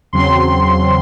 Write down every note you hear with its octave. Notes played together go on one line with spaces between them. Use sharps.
E2 C#3 F#3 C4 C6